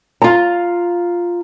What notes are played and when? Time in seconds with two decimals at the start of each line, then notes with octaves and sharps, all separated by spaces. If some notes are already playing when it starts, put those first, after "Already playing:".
0.22 F4 A#5